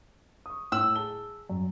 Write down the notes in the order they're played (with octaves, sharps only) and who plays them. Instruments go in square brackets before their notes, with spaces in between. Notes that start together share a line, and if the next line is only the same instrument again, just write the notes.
[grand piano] C#6 D#6
[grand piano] A2 F#7 [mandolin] E6
[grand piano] G#4 A5 G7
F#2